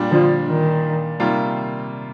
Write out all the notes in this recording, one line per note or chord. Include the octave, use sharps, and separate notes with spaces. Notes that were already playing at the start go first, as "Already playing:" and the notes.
Already playing: A#2 G3 D4
D3 F3
D#3
C3 D#3 G3 A#3 F4